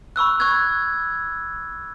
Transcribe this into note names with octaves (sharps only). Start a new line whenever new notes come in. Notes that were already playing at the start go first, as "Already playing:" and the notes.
B5 C#6 E6 F#6
C#6 F#6 G#6